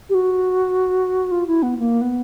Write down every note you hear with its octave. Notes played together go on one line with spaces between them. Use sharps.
G4
F#4
F4
E4
B3
A#3
B3